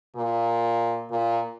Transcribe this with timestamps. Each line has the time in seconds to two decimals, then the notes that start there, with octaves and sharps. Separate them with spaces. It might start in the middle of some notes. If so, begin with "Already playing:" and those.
0.16 A#2
1.10 A#2